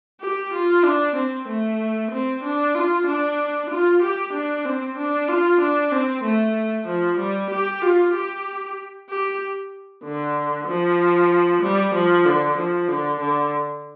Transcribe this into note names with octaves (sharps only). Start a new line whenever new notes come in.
G4
F4
D4
C4
A3
C4
D4
F4
D4
F4
G4
D4
C4
D4
F4
D4
C4
A3
F3
G3
G4
F4
G4
G4
D3
F3
G3
F3
D3
F3
D3
D3